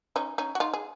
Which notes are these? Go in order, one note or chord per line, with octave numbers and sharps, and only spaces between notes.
C#4 D#4
C#4 D#4
F#4
D#4 F4
G#4